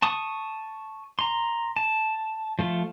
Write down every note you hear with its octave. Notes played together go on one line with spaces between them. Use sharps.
A5 C#6 D#6
A#5 C6
A5
F3 A3 F4